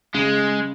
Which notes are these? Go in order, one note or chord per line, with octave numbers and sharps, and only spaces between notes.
C#3 G#3